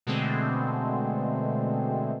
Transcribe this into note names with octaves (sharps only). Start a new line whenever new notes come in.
B2 D3 G#3 A3 C4